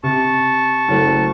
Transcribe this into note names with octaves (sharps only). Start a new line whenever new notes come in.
C3 A5 C#6
F#1 F#3 A3